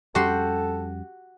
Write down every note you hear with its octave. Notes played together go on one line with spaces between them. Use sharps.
F2 G3 C#4 F#4 G4 A4 C6